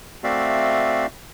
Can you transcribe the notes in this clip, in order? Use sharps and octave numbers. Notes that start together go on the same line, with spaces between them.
A3 C4 F#4 D5 E5 F5